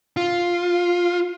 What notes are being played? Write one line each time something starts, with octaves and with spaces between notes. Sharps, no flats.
F4